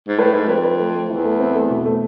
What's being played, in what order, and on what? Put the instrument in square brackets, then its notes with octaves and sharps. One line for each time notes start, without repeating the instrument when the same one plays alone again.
[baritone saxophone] G#2
[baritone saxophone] A2 [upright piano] B4
[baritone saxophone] G#2 [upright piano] A3
[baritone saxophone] F2 [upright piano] B4
[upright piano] B4
A3
A3
[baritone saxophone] E2 [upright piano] E4
[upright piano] A3
C4
A3
B2
A3